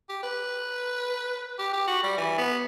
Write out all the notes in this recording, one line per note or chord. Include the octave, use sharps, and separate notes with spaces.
G4
B4
G4
G4
F#4
G3
E3
B3